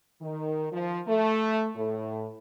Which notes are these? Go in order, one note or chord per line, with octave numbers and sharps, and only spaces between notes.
D#3
F3
A3
A2